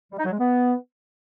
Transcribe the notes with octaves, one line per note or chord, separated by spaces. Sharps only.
G3
D#4
F#3
G#3
B3